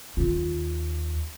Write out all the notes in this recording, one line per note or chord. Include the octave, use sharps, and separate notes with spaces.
D#2 F4